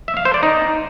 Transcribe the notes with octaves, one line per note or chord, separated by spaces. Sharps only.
E5
F5
C5
D5
D#4